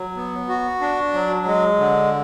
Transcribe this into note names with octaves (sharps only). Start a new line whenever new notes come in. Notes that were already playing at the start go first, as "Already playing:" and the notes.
Already playing: F#3
B3
F#4
D4
F#3
G#3
D3